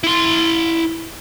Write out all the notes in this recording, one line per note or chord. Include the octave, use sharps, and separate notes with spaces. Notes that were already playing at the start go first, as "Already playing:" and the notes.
E4 C6